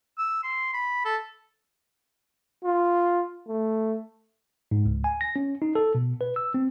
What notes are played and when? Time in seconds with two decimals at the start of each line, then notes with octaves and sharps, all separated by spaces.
0.18 E6
0.43 C6
0.73 B5
1.05 A4
2.65 F4
3.48 A3
4.71 G#2
4.85 C#2
5.04 G#5
5.21 A#6
5.36 C#4
5.62 D#4
5.75 A4
5.95 B2
6.21 B4
6.36 E6
6.54 C4